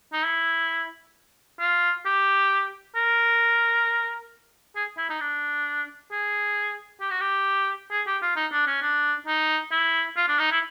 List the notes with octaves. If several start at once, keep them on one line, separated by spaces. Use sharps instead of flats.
D#4
E4
F4
G4
A#4
G#4
E4
D#4
D4
G#4
G4
F#4
G4
G#4
G4
F4
D#4
D4
C#4
D4
D#4
E4
F4
D4
D#4
E4